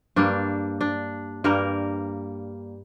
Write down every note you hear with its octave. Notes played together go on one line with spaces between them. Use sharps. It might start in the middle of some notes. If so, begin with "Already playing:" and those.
G2 G3 A#3 D4
D4
G2 G3 A#3 A#4